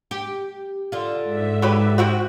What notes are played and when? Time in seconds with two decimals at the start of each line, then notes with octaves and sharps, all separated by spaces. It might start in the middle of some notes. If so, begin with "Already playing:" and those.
0.11 G4
0.92 D3 F4
1.23 G#2 E5
1.62 F#3 G4 B4
1.98 C3 C4 F#4